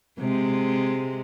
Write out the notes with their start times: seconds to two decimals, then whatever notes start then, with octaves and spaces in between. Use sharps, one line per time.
0.19 C3 G#3